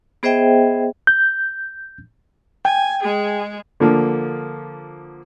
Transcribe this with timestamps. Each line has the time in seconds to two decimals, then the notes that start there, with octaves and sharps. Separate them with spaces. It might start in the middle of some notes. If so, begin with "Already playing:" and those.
0.23 B3 G#4 C5 D#5 E5 G5
1.07 G6
2.65 G5 G#5
3.03 G#3 G#4
3.80 D3 F3 A#3